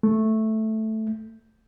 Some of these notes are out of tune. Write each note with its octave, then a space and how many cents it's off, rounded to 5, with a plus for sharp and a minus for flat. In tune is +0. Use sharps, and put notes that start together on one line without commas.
A3 -5